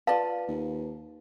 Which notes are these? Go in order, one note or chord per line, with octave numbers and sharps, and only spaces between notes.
F4 B4 D5 F5 A5
D#2